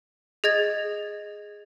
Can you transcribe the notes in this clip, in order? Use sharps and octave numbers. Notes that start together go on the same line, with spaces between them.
G#4 D#5 G#6 A6